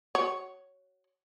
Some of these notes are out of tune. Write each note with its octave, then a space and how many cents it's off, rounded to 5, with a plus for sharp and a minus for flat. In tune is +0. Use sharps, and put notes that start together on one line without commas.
F#4 +20 C#5 +0